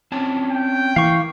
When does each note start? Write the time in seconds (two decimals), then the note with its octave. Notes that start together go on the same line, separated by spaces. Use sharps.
0.12 C4 C#4 A5
0.51 G5
0.96 E3 A#3 F5 C#6